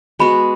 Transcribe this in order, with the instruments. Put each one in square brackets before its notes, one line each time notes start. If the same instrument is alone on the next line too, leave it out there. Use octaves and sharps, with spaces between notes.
[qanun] G#3 B3 F#4 [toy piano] B5